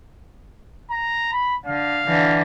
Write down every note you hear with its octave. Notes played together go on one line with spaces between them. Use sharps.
A#5
B5
D3 F5
D3 E3